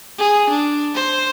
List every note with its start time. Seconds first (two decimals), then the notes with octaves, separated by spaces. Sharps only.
0.18 G#4
0.49 D4
0.95 C5